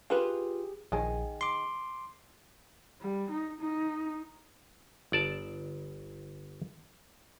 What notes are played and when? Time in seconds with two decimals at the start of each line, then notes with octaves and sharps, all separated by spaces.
0.10 F4 G4 G#4 B4
0.92 A#1 D#3 G#4
1.41 C6 D6
3.01 G3
3.31 D#4
3.60 D#4
5.12 G1 D5 A5